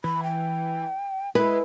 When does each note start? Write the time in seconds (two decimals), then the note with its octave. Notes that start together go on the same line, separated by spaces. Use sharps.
0.04 E3 B5
0.23 G5
1.35 G#3 E4 B4